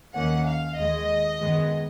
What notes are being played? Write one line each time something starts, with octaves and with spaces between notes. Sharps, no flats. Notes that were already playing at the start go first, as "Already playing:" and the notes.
D#2 D#3 A#3 C#4 F#5
F5
D#2 D#3 G#3 D#5
F#2 D#3 G#3 B3